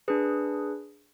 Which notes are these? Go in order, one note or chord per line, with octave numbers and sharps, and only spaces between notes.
D4 G#4 B4